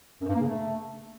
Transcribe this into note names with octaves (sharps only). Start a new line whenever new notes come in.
F#2
G2
A#3
C#3
A3